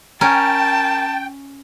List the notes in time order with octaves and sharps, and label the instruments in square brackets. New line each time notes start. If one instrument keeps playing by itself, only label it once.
[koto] C#4 [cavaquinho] A#4 [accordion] G5 [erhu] A5